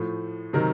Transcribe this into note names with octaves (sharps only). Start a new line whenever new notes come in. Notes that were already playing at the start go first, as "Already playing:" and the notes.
Already playing: A2 F3 A3
C3 D#3 F#3 A#4